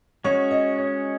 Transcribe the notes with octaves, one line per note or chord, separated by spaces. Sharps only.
G#3 C#4 F#4 C#5
D#5
C#5